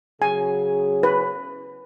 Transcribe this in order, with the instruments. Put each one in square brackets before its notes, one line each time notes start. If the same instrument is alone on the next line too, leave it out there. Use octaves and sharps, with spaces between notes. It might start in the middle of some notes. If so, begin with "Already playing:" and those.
[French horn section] C#3 F#3 G#4 [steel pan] G#5
[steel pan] B4